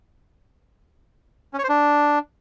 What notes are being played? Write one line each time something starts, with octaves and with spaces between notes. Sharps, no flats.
C#4
C#5
C5
D4